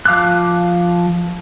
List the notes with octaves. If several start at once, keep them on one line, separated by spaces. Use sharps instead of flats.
F3 F5 D6 F6 F#6